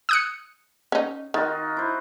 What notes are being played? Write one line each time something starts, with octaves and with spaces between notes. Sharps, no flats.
D#6 F#6 C#7
C#4 D#4
D#3 D#4 F4 F#4
E4 C5